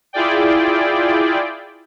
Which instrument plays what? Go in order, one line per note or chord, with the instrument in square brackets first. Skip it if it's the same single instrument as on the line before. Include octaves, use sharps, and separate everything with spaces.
[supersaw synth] E4 F4 G#4 D5 G5